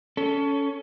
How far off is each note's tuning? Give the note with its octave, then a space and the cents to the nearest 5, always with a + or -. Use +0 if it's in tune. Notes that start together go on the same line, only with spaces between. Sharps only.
C#4 +20 A4 +0